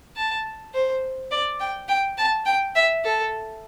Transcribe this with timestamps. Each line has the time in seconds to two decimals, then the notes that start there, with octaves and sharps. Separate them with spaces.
0.16 A5
0.74 C5
1.31 D5
1.60 G5
1.89 G5
2.18 A5
2.46 G5
2.75 E5
3.04 A4